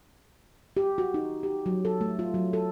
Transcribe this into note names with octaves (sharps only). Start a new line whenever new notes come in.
G4
F#4
D#4
G4
F#3
A4
A3
F4
F#3
A4